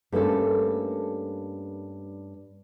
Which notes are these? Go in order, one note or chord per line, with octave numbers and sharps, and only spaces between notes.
G2 A3 A#3 C#4 A4